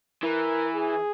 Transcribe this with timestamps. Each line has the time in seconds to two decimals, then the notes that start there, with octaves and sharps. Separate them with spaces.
0.23 E3 A#4
0.75 G#4